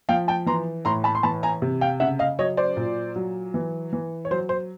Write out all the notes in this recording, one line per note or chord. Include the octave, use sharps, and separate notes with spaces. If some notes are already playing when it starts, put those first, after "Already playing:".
F3 F5 G5
G5 A5
E3 A#5 C6
A2 A#5 C6
A5 B5
C6
E3 A5 B5
G#5 A#5
C3
F5 G5
C#3 E5 F#5
D#5 F5
F#3 C#5 D#5
C5 D5
A#2
F#3
E3
E3
C#5
F#3 C5
C5